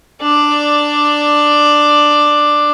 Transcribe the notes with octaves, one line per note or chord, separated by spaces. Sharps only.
D4 D5